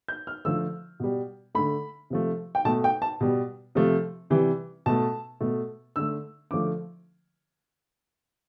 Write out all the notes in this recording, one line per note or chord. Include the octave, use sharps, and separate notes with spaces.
G6
F6
D3 F3 A3 E6
B2 G3
D3 A3 B5
C3 F3 A3
G5
B2 A3 A5
G5
A5
B2 G3
C3 F3 A3
C3 E3 G3
B2 A3 A5
B2 A3
D3 A3 E6
D3 F3 A3 D6